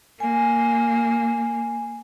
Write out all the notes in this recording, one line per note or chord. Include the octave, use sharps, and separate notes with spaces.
A#3 G#5